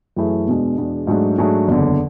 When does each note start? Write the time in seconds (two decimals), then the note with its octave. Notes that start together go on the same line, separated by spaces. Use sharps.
0.16 F#2 E3 A3 E4 G#4
0.47 E2 B2 G#3 D4
0.78 E2 B2 G#3 D4
1.07 G#2 F#3 A3 D4 G#4
1.38 G#2 F#3 A3 D4 G#4
1.68 F#1 E2 D3